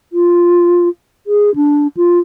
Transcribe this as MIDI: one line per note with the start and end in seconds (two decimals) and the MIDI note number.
0.13 0.89 65
1.27 1.54 68
1.55 1.87 62
1.97 2.19 65